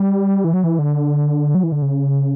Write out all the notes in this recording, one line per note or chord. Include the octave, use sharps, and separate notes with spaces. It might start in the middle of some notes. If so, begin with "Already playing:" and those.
Already playing: G3
E3
F#3
E3
D3
F#3
E3
D3
C#3